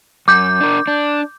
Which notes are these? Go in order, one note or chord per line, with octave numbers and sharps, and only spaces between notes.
F#2 D6 G6
D4 A#4
D4